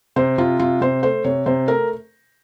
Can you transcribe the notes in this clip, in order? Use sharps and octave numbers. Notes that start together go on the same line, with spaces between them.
C3 C5
C3 F4
C3 F4
C3 C5
A3 C5
C3 C#5
C3 C5
A3 A#4